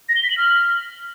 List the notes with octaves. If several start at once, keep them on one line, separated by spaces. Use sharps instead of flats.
A#6
G7
B6
F#7
F6